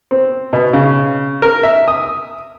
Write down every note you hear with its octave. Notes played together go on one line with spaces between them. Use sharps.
C4
B2
C#3
A#4
E5
D#6